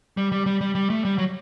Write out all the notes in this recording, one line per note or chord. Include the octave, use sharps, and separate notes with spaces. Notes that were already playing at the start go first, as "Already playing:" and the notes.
G3
G3
G3
G3
G3
A3
G3
F#3